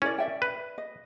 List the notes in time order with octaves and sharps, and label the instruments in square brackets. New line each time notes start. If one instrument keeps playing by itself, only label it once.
[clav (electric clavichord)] C#4 [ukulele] E4 A#4 D5
[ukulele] D5 E5 G5
[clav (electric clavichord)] B4
[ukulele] D#5